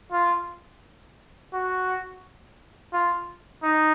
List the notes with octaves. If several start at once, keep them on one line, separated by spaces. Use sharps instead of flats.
F4
F#4
F4
D#4